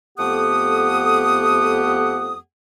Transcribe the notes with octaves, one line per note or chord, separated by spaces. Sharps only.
F2 A3 B3 G4 F#5 D#6